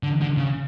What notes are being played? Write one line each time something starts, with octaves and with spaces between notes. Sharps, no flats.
D3
D3
C#3